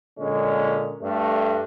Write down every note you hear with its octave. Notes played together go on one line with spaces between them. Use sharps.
A#2 D3 G#3 C#4
G2 A3